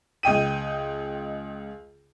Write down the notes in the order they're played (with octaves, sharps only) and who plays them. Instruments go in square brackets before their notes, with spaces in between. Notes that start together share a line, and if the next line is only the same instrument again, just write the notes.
[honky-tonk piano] C#2 D#5 G5 D#7